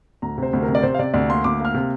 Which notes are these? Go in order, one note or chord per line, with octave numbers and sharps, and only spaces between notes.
D2 A#5
C3 C5
D2
A#4
C3
D5
C3 C5
F5
C3 D5
D2 D5
A#3 C6
D2 D6
A#3 F6
C3